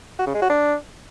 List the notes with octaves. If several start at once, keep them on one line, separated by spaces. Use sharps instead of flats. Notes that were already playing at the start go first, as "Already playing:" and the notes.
F#4
C#3
G#3
F#4
D4